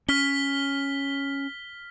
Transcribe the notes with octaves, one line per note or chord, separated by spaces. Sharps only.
C#4 F6 B6 G7